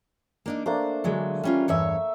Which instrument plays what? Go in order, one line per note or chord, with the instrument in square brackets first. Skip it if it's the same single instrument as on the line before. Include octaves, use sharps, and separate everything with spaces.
[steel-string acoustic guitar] A#3 D4 D#4
[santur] A3 A#3 D4 [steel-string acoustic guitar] C5
[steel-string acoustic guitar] D3 F#3 G#3
G3 C#4 F4
[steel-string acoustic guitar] E2 G2 C#5 [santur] E5 C#6